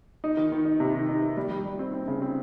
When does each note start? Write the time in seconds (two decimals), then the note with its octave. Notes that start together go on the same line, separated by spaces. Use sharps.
0.24 D#4
0.37 D#3
0.52 D#3
0.65 D#4
0.80 C3
0.94 D#3
1.08 D#4
1.22 D#3
1.37 G3
1.50 G3
1.66 G3
1.79 C4
1.93 C4
2.08 C#3
2.22 C4